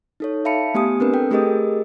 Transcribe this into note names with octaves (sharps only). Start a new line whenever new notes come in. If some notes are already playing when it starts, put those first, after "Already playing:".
D#4 A4 C#5
E5 F5 A5 B5 C#7
A3 B3 G4 G#5 D#6
C4 D4 A#4 B4
A4 G5
A3 G4 G#4 A#4 D#5 D#6